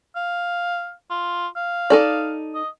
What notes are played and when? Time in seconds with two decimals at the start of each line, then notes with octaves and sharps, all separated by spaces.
0.16 F5
1.10 F4
1.56 F5
1.90 D#4 A4 D5
2.55 D#5